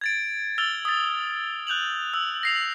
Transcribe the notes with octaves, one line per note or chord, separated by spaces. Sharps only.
G#6 A6 D7
E6 F6 A6 F7 G7
D#6 A6
F#6 G6 F7 F#7
E6
A#6 C7 F7